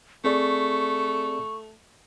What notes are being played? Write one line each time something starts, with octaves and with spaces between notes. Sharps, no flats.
A3 C4 G#4 D5 C#6